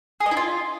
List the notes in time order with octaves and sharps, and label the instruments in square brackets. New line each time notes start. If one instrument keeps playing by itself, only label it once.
[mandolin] G#4
D#5
E4
F4